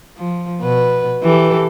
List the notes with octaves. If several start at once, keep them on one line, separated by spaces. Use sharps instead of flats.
F3
B2 B4
E3 G4 A4